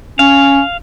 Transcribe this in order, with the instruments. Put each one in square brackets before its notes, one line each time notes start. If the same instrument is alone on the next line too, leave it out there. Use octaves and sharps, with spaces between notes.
[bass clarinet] C#4 [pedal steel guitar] F5